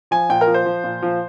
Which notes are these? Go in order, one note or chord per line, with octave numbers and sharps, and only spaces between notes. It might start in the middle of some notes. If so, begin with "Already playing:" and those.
F3 G#5
A#2 G5
A#4
F3
C5
F3
A#2
F3